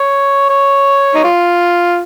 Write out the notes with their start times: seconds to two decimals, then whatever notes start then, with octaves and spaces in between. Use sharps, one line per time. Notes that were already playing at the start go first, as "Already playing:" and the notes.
Already playing: C#5
0.50 C#5
1.15 D#4
1.24 F4